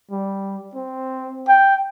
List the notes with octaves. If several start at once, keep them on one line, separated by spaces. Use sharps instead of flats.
G3
C4
G5